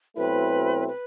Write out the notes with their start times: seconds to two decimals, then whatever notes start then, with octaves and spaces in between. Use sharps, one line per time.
0.16 B2 F#3 A3 C4 E4 B4
0.88 B4